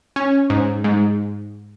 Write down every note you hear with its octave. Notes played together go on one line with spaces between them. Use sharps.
C#4
G#2
G#2